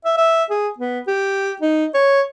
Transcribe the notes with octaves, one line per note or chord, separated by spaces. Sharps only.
E5
E5
G#4
B3
G4
D#4
C#5